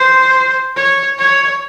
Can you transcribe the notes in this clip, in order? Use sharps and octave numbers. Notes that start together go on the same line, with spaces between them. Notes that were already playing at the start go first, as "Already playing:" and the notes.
Already playing: C5
C#5
C#5